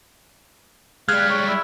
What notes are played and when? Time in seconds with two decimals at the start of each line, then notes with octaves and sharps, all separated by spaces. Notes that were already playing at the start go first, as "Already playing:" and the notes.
1.09 G3 G#3 F5 F6 F#6 G#6
1.29 C#5
1.49 E4